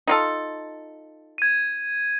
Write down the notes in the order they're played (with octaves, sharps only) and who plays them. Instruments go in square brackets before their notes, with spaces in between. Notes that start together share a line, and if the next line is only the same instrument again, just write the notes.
[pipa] D#4 F4 A4
[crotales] G#6 D#7